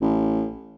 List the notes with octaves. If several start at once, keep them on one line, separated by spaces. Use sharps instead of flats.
A1